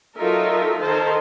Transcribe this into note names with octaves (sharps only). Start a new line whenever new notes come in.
F#3 D#4 F4 A4 A#4 E5
D#3 A4 C5 A5